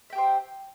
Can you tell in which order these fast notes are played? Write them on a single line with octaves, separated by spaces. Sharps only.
E5 G5 G4 C5